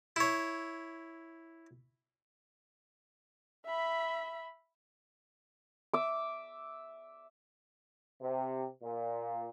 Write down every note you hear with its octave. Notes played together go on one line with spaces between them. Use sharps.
E4 C#5
E5 B5
E5 D6
C3
A#2